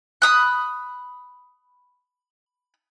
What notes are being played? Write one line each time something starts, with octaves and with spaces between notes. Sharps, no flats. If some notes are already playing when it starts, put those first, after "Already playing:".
B5 D#6 F#6